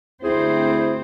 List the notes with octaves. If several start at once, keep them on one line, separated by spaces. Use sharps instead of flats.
D2 C4 E4 G#4 C5